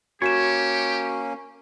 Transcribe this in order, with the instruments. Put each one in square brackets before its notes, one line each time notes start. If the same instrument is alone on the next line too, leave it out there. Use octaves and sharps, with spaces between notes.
[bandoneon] A#3 C#4 [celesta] F#4 C#7 E7 [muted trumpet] G4 [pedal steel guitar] C#5